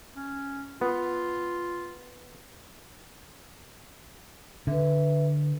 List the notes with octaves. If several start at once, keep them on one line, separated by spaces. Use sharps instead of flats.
C#4
B3 F4
D3 B4 E5